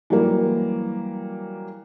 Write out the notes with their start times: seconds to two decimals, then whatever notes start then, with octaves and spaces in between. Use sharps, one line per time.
0.10 E3 F#3 G3 A#3